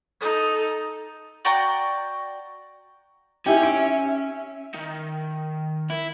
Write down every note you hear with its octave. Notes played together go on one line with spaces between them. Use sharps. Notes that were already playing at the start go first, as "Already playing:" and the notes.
D#4 A4
F#4 D5 G5 A#5
C#4 D#4 E4 G4 G#5
E5 D7
D#3
E4